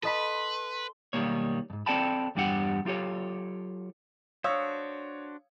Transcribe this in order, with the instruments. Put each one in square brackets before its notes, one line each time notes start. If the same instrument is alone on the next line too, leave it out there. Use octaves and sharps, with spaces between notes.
[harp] A4 D#5 B5 [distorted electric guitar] B4 [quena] C6
[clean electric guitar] B1 D#3 F3 G3 A#3 C#5
F2 G#2
C4 A4 D5 G5 A5 B5
E2 G2 G3 D4 G4 F#5
F#3 F4 G4 A4 C#5
[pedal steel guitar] D4 F#4 C5 [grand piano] C#5 [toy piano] F5 D#6 E6